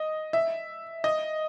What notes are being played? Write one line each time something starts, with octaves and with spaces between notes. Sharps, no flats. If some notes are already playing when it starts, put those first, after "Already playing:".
Already playing: D#5
E5
D#5